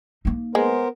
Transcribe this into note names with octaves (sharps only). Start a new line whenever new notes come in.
A#3 D#4
G#3 B3 A#4 C5